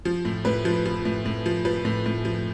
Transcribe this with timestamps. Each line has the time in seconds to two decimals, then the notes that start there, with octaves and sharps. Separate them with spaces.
0.05 F3
0.25 A2
0.45 A2 B4
0.65 F3
0.86 F3
1.05 A2
1.25 A2
1.46 F3
1.65 F3 B4
1.85 A2
2.06 A2
2.25 F3